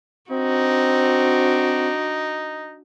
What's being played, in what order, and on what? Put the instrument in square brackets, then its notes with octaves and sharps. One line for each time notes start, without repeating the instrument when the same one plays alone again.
[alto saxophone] C4 [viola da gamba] D4 F#4 [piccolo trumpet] D#4